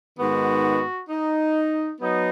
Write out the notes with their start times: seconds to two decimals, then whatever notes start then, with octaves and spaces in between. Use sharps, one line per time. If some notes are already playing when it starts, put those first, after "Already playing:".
0.18 G#2 D#3 B3 F#4
1.09 D#4
2.00 F#3 B3 D#4